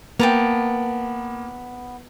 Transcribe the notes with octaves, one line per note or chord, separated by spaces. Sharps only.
A#3 B3 G5 A5 A#5